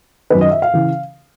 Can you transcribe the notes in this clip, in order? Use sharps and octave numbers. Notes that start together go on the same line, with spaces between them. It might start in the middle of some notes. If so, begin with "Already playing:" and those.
F#2 D#3 B4
D#5
E5
F5
C#3 E3